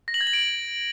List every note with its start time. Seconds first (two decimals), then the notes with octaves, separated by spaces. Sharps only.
0.08 A#6
0.14 F#7
0.21 G#6
0.27 F#7
0.33 D7